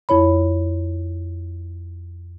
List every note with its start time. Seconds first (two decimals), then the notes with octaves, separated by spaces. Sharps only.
0.09 F2 E4 C#5 B5